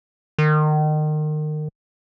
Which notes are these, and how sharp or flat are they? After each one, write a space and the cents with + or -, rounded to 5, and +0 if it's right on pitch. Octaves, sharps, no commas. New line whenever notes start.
D#3 -30